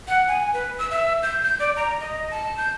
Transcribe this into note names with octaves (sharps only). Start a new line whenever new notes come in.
F#5
G#5
B4
E6
E5
G6
G6
D5
A#5
D#5
A5
G6